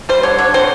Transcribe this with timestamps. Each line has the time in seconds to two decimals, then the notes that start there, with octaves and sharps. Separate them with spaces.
0.09 G3 C5
0.23 D3 C#5
0.38 D3 C#5
0.54 C4 C5